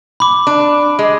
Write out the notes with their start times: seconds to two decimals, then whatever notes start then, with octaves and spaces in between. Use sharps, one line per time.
0.20 B5 D6
0.47 D4
0.99 G#3